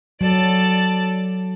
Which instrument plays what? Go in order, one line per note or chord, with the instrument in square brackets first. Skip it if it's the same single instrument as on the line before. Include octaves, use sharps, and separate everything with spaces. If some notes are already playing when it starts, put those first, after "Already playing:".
[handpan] F#3 [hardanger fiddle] A4 D5